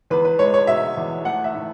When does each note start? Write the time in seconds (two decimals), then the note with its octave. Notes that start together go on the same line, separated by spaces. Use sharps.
0.10 E2 B4
0.25 B4
0.39 G#3 C#5
0.54 C#5
0.67 B2 E5
0.97 E2
1.25 A3 F#5
1.44 E5
1.55 A2